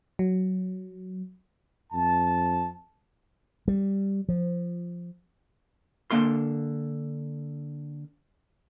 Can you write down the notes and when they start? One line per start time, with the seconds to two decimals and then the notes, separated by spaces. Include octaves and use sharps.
0.19 F#3
1.93 F2 A5
3.68 G3
4.29 F3
6.11 D3 A#3 F5 C6